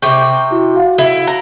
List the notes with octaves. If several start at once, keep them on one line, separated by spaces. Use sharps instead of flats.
C3 G5 C#6 D6
E4 F#4
F#4 F5 F#5
E4
A#5